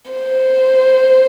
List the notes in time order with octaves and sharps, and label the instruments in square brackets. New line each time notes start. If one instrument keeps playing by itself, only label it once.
[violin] C5